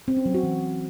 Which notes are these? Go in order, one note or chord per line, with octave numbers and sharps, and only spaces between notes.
C4
C#4
F#3
F#4
E3